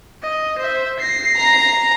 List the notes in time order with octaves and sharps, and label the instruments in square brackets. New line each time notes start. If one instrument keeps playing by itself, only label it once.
[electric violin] D#5
C5 E5
A#6 C7
[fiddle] A#5